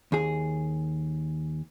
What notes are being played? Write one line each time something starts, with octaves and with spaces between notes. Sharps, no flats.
D#2 G#4